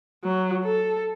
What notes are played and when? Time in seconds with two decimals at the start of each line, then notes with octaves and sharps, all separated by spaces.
0.24 F#3
0.64 A4